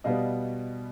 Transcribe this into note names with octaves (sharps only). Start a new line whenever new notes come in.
B2 G3 B3 D#5 F5